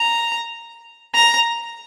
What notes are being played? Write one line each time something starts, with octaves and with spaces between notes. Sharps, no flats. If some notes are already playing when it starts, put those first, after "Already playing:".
Already playing: A#5
A#5